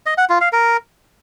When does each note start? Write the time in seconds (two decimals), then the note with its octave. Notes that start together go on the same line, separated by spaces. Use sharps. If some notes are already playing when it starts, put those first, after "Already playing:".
0.06 D#5
0.18 F#5
0.29 F4
0.41 F5
0.53 A#4